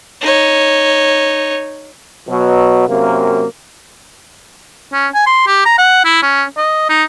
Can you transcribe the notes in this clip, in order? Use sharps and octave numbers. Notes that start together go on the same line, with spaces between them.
D#4 C#5
B2 F#3
F#2 C3 A#3
C#4
G#5
C6
G4
A#5
F#5
E4
C#4
D#5
D#4